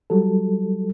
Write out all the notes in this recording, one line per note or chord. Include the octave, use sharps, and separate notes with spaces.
F#3 G3 A4